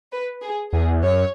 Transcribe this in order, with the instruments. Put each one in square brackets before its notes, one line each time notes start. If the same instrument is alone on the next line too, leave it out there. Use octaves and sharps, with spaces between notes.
[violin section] B4
G#4
[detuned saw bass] E2 [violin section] G#4
[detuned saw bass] F#2 [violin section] C#5